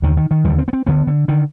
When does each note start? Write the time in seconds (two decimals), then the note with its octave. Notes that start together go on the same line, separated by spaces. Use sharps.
0.02 D#2 D3 D#3
0.17 D#3
0.31 D#3
0.44 D#2 D3 G3
0.58 C4
0.68 B3
0.73 C4
0.87 D2 D3 B3
1.07 D3
1.28 D3 D#3